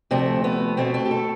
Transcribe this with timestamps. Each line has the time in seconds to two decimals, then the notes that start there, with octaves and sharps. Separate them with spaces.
0.11 D2 C3 F3 A3 C4
0.44 B3
0.77 B2 A3 C4
0.94 C4
1.05 G4
1.11 A4